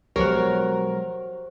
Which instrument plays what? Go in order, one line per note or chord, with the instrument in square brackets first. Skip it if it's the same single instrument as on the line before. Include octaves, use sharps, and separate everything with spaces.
[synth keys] B1 A#4 [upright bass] F3 G#3 [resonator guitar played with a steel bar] F#4 C#5 [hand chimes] G4 C5